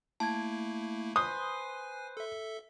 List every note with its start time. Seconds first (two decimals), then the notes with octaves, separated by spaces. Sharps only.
0.20 A3 A#3 E4 A5 G#6
1.16 B4 C5 G#5 D#6
2.17 A4 E5